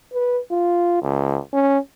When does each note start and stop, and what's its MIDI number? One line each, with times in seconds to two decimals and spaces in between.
0.13 0.39 71
0.51 1.00 65
1.02 1.38 37
1.53 1.78 61